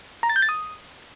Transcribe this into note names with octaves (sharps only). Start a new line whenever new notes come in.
A#5
A6
G6
A6
D#6